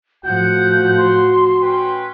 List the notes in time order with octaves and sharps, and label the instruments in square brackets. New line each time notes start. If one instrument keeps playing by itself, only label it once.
[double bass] A2 F3 [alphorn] F#4 [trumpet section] F#5 [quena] G6
[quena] C6
[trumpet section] C#4 B4 G5 [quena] C6